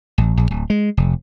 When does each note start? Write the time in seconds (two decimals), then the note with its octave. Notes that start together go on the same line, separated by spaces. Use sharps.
0.18 A1
0.37 A#1
0.51 D1
0.70 G#3
0.97 F1